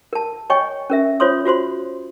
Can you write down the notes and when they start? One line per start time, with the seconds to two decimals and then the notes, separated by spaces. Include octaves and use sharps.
0.13 A#4 A5
0.50 C#5 D#5 G5 G#5 C#6
0.90 C#4 A#4 E5
1.20 F4 C5 C#5 C6 D#6
1.45 F4 F#4 C5 C6